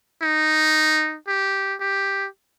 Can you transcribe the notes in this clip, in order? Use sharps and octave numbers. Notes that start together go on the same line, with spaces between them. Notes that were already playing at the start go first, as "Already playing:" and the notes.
D#4
G4
G4